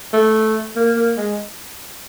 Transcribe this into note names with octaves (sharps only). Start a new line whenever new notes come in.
A3
A#3
A#3
G#3